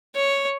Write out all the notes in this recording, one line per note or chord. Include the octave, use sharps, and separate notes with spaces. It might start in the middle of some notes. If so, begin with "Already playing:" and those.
C#5